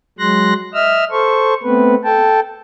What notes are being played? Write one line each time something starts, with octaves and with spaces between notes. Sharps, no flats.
F#3 G#3 C6 F#6 A#6
D#5 E5 E6 F6
A4 C5 C#6
A3 B3 C4 B4
A4 G5 A5